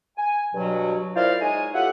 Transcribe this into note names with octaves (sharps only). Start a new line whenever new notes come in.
G#5
G2 B2 F#3
E4 F4 A#4 C5 D5 F5
G#3 D#4 C#5 D#5 G#5
A2 F4 G4 E5 F#5